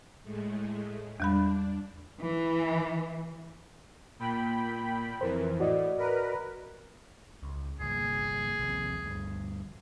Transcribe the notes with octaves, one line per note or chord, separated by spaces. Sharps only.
A2 G#3 A3
E2 G3 D4 B5
E3
A#2 G5 B5
F2 E3 A#4 C5
A2 F#4 D5 D#5
A#4 B4
C#2
G1 C2 A#2 G#4
A#1 D#2 C3
D2 G2